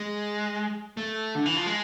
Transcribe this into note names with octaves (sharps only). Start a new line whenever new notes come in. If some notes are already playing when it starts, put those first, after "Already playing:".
Already playing: G#3
A3
D3
E3
F3
G#3